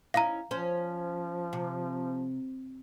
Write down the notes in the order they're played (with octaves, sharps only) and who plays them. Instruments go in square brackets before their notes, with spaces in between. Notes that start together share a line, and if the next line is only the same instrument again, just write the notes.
[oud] C#4 D#4 E4 [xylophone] F5 A#5
[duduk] F3 [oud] C#4 C5
[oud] C3